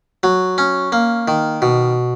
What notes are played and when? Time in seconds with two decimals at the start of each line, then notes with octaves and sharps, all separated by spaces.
0.23 F#3
0.58 C#4
0.92 A#3
1.28 D#3
1.62 B2